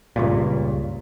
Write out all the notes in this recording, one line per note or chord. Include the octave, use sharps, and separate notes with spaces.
C#2 G2 A#2